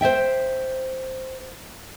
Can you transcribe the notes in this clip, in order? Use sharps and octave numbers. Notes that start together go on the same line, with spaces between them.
C5 D5 E5 G5